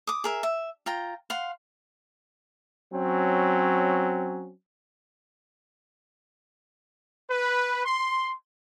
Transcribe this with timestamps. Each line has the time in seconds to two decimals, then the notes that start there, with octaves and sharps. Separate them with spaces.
0.07 D6 D#6
0.24 G#4 A#4 E5
0.43 E5
0.86 F4 G5 A#5
1.30 F5 F#5 C6
2.93 F#3 C4 C#4
7.29 B4
7.85 C6